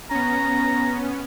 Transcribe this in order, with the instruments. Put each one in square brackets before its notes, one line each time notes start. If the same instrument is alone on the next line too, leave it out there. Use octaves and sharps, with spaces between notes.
[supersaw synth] B3 C#4 [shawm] A#5